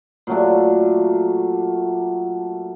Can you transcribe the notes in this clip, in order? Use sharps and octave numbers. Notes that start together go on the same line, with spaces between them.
A#2 F#3 A3 D4